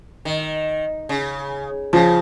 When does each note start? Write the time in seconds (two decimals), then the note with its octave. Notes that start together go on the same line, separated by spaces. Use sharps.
0.25 D#3
1.09 C#3
1.93 C#3 F3